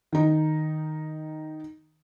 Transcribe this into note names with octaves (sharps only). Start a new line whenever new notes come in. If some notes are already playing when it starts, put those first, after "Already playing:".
D#3 D#4